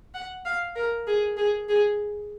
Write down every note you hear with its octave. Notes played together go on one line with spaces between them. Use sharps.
F#5
F5
A#4
G#4
G#4
G#4